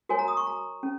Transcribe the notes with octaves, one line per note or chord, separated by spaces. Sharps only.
F#4 A#4 C#5 G#5
A#5
D#6
C#6
A#5
C#4